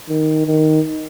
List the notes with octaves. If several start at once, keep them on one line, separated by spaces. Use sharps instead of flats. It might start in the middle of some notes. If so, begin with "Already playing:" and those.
D#3
D#3